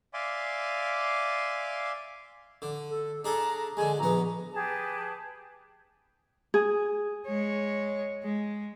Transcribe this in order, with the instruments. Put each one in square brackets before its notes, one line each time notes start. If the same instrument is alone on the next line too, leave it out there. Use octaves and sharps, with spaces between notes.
[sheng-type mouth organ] D5 E5 F5 G#5 C6 D6
[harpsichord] D3
[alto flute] A4
[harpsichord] D4 G#4 A4 [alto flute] A#5
[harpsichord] D3 G#3 [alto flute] G#5
[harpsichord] A#1 B3 [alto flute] A#5
[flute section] G4 G#4 B4 A5
[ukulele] G#4
[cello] G#3 C#5
G#3